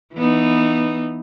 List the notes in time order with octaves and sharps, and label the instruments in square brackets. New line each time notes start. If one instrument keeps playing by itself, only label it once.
[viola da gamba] E3 B3 D#4